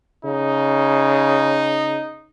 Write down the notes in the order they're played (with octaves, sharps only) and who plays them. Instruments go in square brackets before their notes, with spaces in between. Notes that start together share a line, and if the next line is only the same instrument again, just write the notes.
[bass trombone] C#3 [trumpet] D#4